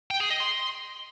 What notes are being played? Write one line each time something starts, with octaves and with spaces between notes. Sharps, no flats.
G5
G#4
D#5
C6